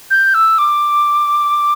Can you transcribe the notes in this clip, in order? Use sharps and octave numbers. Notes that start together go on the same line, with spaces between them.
G6
E6
D6